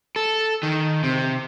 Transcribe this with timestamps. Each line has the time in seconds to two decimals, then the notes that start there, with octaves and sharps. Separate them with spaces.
0.16 A4
0.63 D#3
1.03 C3